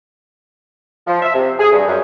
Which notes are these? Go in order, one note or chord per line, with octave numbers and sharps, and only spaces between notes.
F3
E5
C3
G#4
G2
F#2